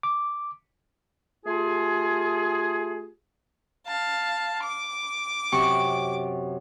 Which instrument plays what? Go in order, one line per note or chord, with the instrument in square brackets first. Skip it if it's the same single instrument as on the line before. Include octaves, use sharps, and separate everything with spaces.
[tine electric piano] D6
[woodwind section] A3 F4 G4 G#4
[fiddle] F5 A5
D6
[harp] F#2 C3 C#6